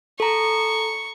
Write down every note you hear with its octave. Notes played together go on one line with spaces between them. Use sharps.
A4 A#5 C#6